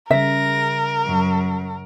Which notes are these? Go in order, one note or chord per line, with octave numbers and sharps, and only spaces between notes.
C#3 G3 A#4 E5 A#6
F#2